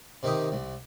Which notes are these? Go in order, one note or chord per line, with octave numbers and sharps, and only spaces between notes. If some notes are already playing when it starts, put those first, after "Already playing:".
C3 D#3 G4 D#6
C2